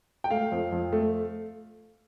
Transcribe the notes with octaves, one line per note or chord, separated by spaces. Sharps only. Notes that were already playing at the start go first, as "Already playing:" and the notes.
G5
A3 F5
F2
F2
A3